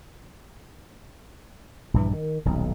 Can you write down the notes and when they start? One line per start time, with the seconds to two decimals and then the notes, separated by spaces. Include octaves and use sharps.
1.94 A#1 G2 E3
2.13 D#3
2.45 D#1 B1